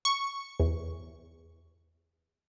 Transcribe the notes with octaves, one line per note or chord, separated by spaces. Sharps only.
C#6
E2